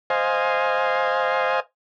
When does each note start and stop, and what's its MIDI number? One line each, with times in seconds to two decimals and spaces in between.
0.10 1.60 72
0.10 1.60 75
0.10 1.60 77
0.10 1.60 80